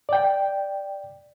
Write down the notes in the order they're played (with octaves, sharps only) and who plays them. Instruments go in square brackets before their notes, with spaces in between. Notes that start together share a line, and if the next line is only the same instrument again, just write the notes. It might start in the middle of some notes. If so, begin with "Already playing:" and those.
[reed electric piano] D5 G5